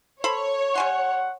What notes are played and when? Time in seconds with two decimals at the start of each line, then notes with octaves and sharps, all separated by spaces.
0.24 A4 C5 C#5 B5
0.75 G3 F#5 G#5 C6